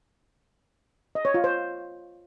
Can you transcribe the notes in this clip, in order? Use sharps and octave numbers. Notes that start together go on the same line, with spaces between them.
D#5
C#5
F4
C5